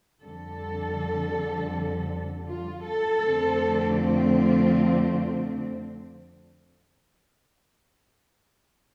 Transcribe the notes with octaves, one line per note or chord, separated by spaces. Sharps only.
F2 D3 G3 A4
F4
A4
F2 D3 A3 C4
F4